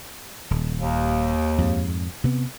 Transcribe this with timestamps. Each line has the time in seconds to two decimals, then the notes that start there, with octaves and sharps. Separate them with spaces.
0.51 D#1
0.78 D#2
1.58 F2 G#2
2.24 C3 B3